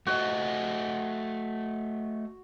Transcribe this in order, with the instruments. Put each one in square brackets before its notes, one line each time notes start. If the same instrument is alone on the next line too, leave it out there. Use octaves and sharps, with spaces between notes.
[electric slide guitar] A3 C5 D#5 [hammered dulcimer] F#4